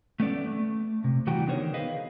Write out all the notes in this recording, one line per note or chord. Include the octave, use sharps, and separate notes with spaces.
A3 B3 C#4 A4 D5
A3
C3
D#3 E3 G3 F#4 G5 A#5
D3 B3 D#4 A#4 C5 C#5
G#4 B4 D#5 F5